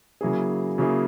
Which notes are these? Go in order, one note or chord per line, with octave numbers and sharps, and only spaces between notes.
C#3 F#3 A#3 E4 G#4
C#3 F#3 A#3 E4 G#4